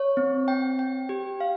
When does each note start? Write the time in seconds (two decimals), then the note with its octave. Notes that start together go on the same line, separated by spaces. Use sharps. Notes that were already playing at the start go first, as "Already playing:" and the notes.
Already playing: C#5
0.17 C4
0.48 G5
0.79 G5
1.09 G4
1.41 F5